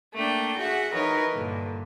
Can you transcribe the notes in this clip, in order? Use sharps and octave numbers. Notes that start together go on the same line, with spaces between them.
A3 A#3 D4 G5
F#4 G#4 E5 F#5
E3 D#4 A#4 B4 C#5
G2 A#2 D3